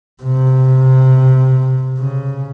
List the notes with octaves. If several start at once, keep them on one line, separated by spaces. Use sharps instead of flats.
C3
C#3